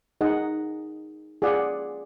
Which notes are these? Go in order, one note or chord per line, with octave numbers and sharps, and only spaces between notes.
D#4 G#4 D#5 F#5
F4 G#4 D5 F#5